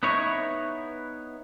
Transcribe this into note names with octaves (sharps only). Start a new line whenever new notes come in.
B3 D#4 E4 C#5